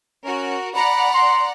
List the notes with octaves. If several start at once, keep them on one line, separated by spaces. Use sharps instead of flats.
C#4 F#4 A#4
D5 F#5 A#5 B5
C6